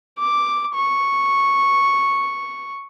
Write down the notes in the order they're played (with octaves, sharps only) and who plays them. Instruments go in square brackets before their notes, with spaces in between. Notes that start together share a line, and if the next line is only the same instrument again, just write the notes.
[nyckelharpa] D6
C#6